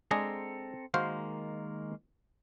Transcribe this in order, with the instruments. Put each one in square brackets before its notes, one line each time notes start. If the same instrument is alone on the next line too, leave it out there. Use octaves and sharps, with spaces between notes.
[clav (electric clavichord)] G#3 D4 G#4 [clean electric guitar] C4 A4 A#5
[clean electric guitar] D#3 G#3 A#3 [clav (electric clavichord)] F#4 C5 F5